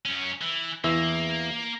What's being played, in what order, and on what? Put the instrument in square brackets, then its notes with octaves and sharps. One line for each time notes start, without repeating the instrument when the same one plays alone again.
[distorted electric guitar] F#2 C#4
E3
[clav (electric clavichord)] E2 E3 E5 [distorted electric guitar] A#3